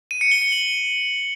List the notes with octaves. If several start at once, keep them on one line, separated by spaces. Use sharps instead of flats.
D#7
C#7
G7
C#7
F#7